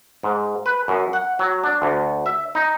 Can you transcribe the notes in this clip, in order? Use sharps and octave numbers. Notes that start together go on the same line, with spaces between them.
G#2
B4
F#2
F#5
F#3
D4
D2
E5
D#4